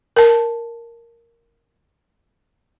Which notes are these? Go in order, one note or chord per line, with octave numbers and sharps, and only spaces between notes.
A#4 A5